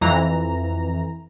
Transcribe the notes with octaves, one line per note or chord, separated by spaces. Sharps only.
F2 E3 A#5